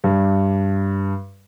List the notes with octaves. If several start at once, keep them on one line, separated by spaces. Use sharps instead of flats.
G2